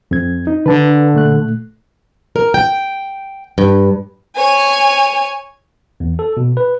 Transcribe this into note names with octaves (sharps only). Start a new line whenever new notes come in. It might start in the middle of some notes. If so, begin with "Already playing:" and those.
F2 C4 G#6
D#4
D3 B4 A5
A#2 A3 F#6
A#4
G5
G2
C#5 G#5
E2
A4
B2
B4